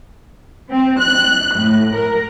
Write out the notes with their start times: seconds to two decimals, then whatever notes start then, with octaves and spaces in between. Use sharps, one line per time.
0.70 C4
1.00 F#6
1.55 A2
1.95 A#4